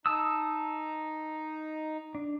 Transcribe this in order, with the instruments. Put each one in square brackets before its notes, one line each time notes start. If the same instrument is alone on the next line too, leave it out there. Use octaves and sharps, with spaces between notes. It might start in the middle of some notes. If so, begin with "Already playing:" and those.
[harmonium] D#4 [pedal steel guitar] A5 D#6 E6
[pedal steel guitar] D4